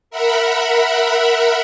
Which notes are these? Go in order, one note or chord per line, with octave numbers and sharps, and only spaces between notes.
A#4 E5 F#5 B5